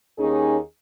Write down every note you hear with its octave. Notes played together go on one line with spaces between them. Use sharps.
D#2 C#4 D#4 G#4